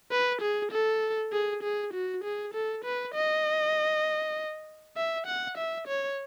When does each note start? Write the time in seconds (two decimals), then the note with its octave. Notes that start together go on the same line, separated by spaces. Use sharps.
0.11 B4
0.42 G#4
0.72 A4
1.33 G#4
1.63 G#4
1.93 F#4
2.24 G#4
2.54 A4
2.84 B4
3.15 D#5
4.97 E5
5.27 F#5
5.57 E5
5.87 C#5